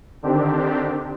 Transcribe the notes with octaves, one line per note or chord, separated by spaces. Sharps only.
D3 D#3 C4 D4 G4